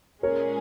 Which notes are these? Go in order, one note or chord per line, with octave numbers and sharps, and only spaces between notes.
A#2 G#3 C#4 G#4 A#4 C#5